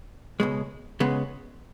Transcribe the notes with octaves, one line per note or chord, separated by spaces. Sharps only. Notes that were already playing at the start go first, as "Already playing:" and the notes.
C#2 B2 G#3
C#2 C#3 G#3 B3